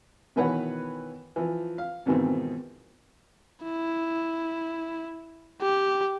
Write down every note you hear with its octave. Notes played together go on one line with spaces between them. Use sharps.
B2 D#3 E3 B4 C#5 F#5
E3 F3
F5
F2 G#2 B2 D#3 E3 C4
E4
G4